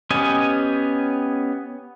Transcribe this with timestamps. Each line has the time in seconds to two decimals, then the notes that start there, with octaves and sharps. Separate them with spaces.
0.10 B3 C#4 G4 D#5 G#5